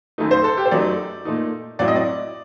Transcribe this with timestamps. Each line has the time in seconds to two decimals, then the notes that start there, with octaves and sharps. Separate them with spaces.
0.18 F#2 D#3 A3 D#4
0.31 C5
0.44 A4
0.58 G4
0.65 C5
0.71 F#2 F#3 A3 D#4 D5
1.25 A#2 A3 D#4
1.79 A2 F#3 C4 D5
1.88 D#5
1.96 D5